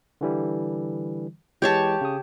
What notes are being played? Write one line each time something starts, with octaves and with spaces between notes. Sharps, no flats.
D3 E3 G3
E3 G#3 G4 C#5 A5
C#3 D#6